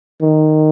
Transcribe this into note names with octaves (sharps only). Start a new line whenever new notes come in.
D#3